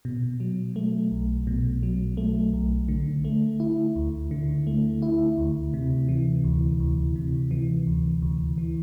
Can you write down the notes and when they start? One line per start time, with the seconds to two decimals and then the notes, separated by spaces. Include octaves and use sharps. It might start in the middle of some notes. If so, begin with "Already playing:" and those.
0.05 B2
0.40 F#3
0.76 A3
1.11 B1
1.47 B2
1.83 F#3
2.17 A3
2.54 B1
2.88 D3
3.25 A3
3.60 E4
3.96 D2
4.31 D3
4.67 A3
5.02 E4
5.37 D2
5.74 C3
6.09 E3
6.44 D2
6.80 D2
7.16 C3
7.51 E3
7.87 D2
8.22 D2
8.58 E3